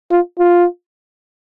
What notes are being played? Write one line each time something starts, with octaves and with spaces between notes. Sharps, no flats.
F4
F4